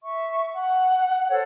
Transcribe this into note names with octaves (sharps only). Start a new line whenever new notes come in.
E5 C#6
F#5
A4 C5 C#5 F#5